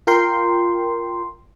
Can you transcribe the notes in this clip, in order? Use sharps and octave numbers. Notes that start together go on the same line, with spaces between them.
F4 A#4 G5 C6